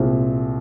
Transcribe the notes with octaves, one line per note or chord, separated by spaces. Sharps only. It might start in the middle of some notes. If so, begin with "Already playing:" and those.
Already playing: C2 A#2 G#3 C4